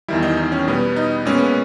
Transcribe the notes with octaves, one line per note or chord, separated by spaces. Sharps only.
E2 D#3 G3 E4
D#4
D#4
C#4
B2 G3 B3
D#4
A#2 G#3 B3 C#4